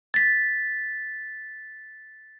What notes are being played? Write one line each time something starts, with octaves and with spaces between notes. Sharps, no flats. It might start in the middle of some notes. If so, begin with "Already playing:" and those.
A6 B6